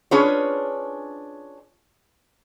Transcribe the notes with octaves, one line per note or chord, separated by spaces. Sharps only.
C#4 D4 F4 G#4 B4 C#5